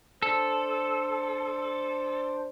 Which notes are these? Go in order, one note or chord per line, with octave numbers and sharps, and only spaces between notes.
D4 A4 C5